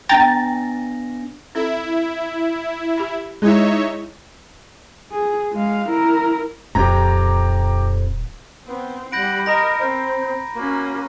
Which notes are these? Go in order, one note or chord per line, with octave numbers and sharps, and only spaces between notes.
B3 D4 G5 A#5 A6 A#6
C4 E4 A4
G4 B5
G#3 D#4 E4 G#4 C#5 E5
G#4
G#3 F5
E4 A#4
D#1 F2 G4 A#5
B3 C4
G3 F#5 B5 G6 A#6 D7
A#4 D#5 A#5 B5 A#6
C4 C5
A#3 C#4 F#4